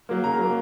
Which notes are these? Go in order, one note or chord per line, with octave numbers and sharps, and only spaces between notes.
F#3 A#3
C#3 A#5
F#3
A#3